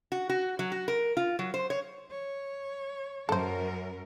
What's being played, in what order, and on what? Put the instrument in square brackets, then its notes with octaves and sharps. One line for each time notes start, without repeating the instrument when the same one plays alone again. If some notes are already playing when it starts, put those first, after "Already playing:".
[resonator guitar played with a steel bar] F#4
F#4
F#3
F#4
A#4
F4
F#3
C5
C#5
[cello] C#5
[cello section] F#2 A#4 [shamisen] A4 C5